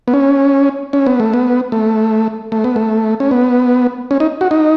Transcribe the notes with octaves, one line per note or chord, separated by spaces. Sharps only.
B3
C#4
C#4
B3
A3
B3
A3
A3
B3
A3
C#4
B3
C#4
D#4
F#4
D#4